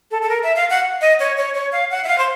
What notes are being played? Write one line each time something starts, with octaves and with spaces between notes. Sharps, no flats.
A4
A4
A#4
E5
F5
F#5
D#5
C#5
C#5
C#5
F5
F#5
E5
F5
C5